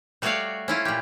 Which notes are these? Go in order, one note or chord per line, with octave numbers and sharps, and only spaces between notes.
G3 A3 F#4 C#5 D5 F5
C#4 E4 F4
A#2 G4